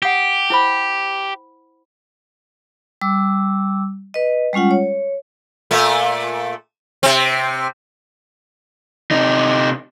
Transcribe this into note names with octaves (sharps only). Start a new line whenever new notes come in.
G4 F#5 D#6
E4 C5 B5
G3 D6 E6
B4 D#5
G3 G#3 C#4 F4 F#5
C#5
A#2 A3
C3 C4
C3 D#4